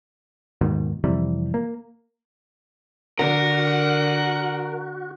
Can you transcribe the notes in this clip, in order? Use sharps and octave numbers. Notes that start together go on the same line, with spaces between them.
D#2 G#2 B2 D#3
F2 C3 E3 G3
A#3
D3 F#4 A#4 F#5